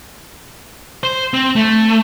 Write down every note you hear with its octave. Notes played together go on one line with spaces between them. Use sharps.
C5
C4
A3